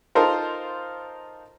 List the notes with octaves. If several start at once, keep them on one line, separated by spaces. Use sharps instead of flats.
D#4 F4 A4 A#4 C5